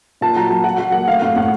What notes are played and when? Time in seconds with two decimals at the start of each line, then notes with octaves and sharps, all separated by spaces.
0.21 A#2 A5
0.36 F#3 A#5
0.50 F#3 A5
0.64 F#3 F#5
0.78 F#3 F#5
0.92 A#3 F#5
1.07 A3 F5
1.22 A2 F5
1.36 A2 F#5